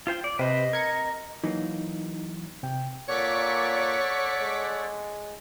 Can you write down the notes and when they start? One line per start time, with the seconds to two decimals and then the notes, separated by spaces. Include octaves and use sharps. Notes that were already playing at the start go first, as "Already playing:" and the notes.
0.07 F4 C5 G5
0.24 D5
0.39 C3 B4 C5 D#5
0.73 A#4 G#6 C#7
1.44 E3 F#3 A#3 D#4
2.63 C3 G5
3.09 A#2 A4 C#5 D5 F#5 C#6 D6 B6
4.41 G#3